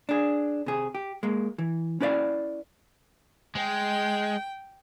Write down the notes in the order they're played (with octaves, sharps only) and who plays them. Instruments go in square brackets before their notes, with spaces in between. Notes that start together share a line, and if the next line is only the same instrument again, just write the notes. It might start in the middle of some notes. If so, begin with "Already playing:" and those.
[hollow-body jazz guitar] D4 G#4
C3 G#4
G4
G#3 A#3
E3
C#4 E4 B4 D5 F5
[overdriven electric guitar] G#3 [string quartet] G5